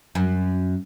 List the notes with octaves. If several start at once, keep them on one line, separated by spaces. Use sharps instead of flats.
F#2